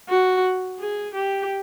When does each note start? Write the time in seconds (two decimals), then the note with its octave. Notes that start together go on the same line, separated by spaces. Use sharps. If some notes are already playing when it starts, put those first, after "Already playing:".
0.09 F#4
0.79 G#4
1.15 G4